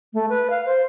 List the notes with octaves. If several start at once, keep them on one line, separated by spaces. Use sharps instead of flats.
A3
B4
F5
C5